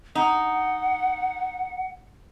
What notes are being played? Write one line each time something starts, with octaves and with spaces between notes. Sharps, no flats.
D#4 F#5